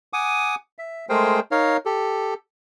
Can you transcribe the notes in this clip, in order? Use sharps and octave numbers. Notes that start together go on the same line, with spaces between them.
F#5 G#5 D6 D#6
E5
G#3 A3 G#4 A#4 C5 G5
D#4 A#4 C#5 F5
G4 A4